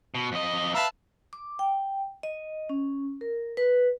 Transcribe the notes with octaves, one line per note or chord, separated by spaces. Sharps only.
B2
F2 D#5
B4 E5 F5 A5 A#5
D6
G5
D#5
C#4
A#4
B4